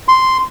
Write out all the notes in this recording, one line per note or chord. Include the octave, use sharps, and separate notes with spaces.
C6